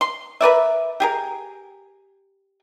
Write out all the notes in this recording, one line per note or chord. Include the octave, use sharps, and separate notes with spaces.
C6
A#4 B4 D5 E5
G4 G#4 A#4